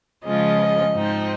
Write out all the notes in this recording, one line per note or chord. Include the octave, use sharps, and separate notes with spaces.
C#3 F3 G#3 C#4 F4 D#5
G#2 F3 C4 D#4